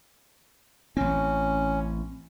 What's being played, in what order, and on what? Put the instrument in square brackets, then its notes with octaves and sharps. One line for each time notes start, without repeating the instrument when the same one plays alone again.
[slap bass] A1 C4 [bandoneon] C#4